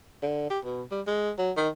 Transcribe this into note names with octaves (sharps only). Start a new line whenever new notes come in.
D3
G4
B2
G3
G#3
F#3
D#3